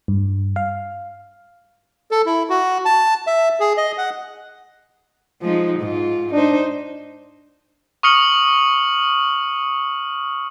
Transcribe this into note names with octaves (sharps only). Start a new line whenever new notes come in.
G2
F5
A4
E4
F#4
A5
E5
G#4
D#5
F#5
F3 G#3 D#4
G#2 F4
D4 D#4 C5
C#6 D#6 F6 C#7 F#7